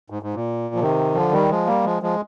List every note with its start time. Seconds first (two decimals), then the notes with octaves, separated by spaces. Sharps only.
0.10 G#2
0.23 G#2
0.34 A#2
0.75 F3
0.80 C3 D#3
1.15 D3 F3
1.32 D#3 G3
1.49 F3 G#3
1.67 G3 A#3
1.85 F3 G#3
2.02 F3 G#3